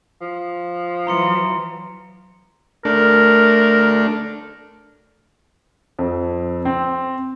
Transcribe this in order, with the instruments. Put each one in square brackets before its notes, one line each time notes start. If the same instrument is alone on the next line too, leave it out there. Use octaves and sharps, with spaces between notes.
[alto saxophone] F3
[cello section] E3 F#3 [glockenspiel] A#5 C6 C#7
[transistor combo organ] A3 D4 [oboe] A#4
[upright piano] F2
C4